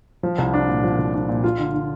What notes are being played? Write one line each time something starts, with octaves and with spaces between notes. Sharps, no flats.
F3
C2
D4
A#2
F3
C2
D4
A#2
F4
D3
D3